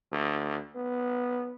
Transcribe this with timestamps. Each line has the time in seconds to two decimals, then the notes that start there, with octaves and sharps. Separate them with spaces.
0.12 D2
0.75 B3